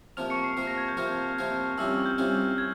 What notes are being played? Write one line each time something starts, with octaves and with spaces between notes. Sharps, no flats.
C3 F3 A#3 F6 F7
C#6 C#7
C7
C3 F3 A#3 C7
A#6
G#6
G6
C3 F3 A#3 F4 F6
C3 F3 A#3 F4
C2 C3 G3 C#4 F4 E6
F6
G6
C2 C3 G3 C#4 F4
G#6